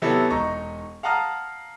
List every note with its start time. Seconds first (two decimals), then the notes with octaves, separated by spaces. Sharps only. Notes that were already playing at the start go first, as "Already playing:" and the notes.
0.02 C3 F#3 B3 E4 A4
0.30 E1 D#4 A#5 C#6
1.03 F5 F#5 A5 A#5 D#6 F6